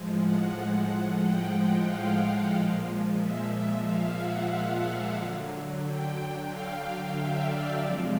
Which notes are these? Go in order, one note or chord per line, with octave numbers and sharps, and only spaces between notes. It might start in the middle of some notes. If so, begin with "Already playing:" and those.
Already playing: A2 F3 G#3
F#5
G5
F#5
F5
A#2 F3 G#3
E5
F5
F#5
D3 F#3
G5
F5
E5
D5
C3 F3 G#3